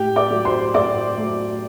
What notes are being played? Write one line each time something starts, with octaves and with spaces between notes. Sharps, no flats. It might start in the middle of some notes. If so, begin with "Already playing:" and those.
Already playing: A2 G4 G5
D5 D6
F#3 A3
C5 C6
A2 D5 D6
F#3 A3